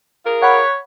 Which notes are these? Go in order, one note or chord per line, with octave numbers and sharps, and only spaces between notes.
F4 G#4 A#4
C#5 F#5 B5